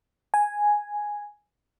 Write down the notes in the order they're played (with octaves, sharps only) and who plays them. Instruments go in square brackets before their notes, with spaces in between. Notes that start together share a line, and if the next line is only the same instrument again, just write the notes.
[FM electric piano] G#5